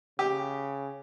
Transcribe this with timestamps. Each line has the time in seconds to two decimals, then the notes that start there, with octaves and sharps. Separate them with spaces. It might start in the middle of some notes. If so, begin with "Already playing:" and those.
0.19 C#3 G4